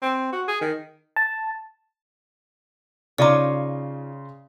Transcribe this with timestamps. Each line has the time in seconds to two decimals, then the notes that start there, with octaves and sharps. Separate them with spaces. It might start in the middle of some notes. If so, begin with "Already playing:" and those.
0.02 C4
0.32 F#4
0.48 G#4
0.61 D#3
1.16 A5
3.18 C#3 D#4 F4 C#5 D5 C6 D6